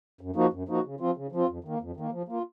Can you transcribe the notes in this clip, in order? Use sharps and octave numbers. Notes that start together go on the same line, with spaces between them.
F#2
F3 A#3 D#4 F#4
F#2
F3 A#3 D#4 F#4
C#3
F3 C4 F4
C#3
F3 C4 F4
F2
D#3 A#3
F2
D#3 A#3
F3
A#3 F4